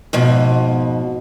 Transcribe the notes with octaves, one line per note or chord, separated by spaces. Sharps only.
F2 G#2 B2